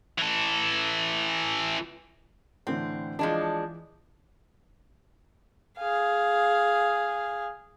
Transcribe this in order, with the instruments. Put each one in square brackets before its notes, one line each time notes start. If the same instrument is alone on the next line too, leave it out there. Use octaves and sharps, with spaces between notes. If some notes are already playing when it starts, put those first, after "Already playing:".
[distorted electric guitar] E3 A4
[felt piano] A2 D3 E3 [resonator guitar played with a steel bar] C4
[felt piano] E3 [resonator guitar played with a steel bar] F3 G#3 D4
[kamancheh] G#4 F5